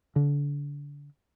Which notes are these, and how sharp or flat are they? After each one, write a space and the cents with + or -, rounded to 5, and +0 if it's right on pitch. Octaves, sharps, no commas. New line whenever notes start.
D3 -30